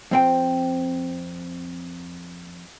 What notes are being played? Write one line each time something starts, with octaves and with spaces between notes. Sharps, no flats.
F2 C4 G5